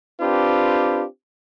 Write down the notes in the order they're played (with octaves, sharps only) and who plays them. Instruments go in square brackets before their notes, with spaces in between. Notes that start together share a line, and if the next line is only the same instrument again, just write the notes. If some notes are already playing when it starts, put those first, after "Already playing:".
[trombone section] C4 D4 F4 G4 B4